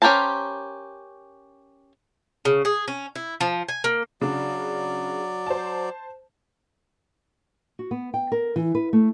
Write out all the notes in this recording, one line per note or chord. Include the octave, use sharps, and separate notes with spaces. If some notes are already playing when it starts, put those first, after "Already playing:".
C#4 G4 A#4 C5 A5
C#3
G#4
C#4
E4
F3
G#5
A#3
C#3 F#3 D4 D5
C5 A5
F#4
B3
G5
A#4
E3
B4
A3